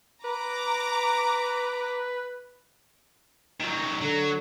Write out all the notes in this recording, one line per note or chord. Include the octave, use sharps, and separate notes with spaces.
B4 A#5 D6
D#3 F#3
D3 F#3